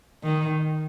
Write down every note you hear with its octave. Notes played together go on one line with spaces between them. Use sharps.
D#3